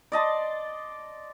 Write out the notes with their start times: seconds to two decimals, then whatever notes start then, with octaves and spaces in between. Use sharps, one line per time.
0.12 D5 D#5 A5 C6